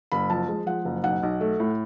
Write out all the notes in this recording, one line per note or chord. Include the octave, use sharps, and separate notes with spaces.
F#1 B5
F3 A5
G#3
F3 F#5
F#1
B1 F#5
B1
A3
A2